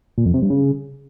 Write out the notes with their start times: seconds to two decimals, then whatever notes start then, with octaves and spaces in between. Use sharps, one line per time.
0.18 A#2
0.26 F2
0.34 C3
0.42 G2
0.50 C#3